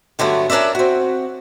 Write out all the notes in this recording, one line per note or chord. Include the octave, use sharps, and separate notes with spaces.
G2 D3 F#3 A3 B3
C#4 D4 A#4 D5 E5
C4 F#4